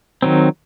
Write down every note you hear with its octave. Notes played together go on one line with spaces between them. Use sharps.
D#3 F#3 C4